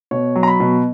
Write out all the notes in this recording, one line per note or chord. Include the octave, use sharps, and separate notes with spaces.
B2 C#5
F#3
A#5
B5
B2